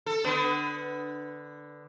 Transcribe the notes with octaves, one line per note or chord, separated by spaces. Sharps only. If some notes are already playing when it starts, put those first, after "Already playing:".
A4
D3 B3